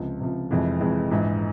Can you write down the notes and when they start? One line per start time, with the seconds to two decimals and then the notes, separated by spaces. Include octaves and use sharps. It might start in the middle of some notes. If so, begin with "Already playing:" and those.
Already playing: C#2 C3 F3
0.20 C#2 C3 F3
0.51 F1 F2 E3 G#3
0.80 F1 F2 E3 G#3
1.11 A#1 G#2 E3